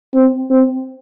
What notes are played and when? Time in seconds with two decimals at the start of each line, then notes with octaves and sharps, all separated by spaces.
0.14 C4
0.50 C4